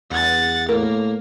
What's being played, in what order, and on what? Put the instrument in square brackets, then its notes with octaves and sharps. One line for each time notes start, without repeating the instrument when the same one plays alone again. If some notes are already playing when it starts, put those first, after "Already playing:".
[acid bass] E2 [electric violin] F#5 A6
[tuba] A2 [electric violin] A#3 [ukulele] A#4